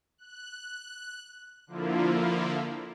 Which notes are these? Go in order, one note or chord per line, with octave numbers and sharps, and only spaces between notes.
F#6
D3 F3 A#3 E4 F4